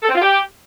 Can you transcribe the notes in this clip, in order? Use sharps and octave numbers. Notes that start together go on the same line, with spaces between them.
A4
C4
F4
G4